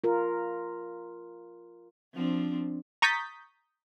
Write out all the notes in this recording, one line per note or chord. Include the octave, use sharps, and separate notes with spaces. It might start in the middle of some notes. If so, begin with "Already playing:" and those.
F4 A#4
F3 C4 D4
A#5 C#6 D#6 G6 A6 B6